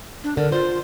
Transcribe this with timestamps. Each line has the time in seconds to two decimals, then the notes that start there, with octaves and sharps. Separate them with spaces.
0.24 D4
0.37 D3 A#4
0.52 F4 C5